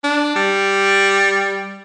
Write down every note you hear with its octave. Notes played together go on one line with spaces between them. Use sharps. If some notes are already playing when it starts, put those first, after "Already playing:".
D4
G3